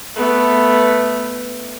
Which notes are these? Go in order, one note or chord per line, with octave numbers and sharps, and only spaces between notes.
A3 B3